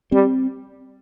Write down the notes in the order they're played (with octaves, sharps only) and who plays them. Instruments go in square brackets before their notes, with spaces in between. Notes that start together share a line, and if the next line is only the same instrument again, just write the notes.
[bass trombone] G3 [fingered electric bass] C4